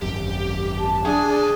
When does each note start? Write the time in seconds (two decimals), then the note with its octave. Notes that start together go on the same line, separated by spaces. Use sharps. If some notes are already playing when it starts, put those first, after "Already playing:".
0.02 G#1 F#2 G4
0.78 A5
1.05 C2 D4 G#4 G#5